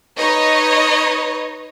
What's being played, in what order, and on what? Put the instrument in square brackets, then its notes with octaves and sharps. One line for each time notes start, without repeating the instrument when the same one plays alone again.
[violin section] D#4 B4 C#5 D#5